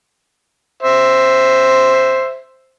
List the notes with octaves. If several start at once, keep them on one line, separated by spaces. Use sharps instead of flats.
C5 E5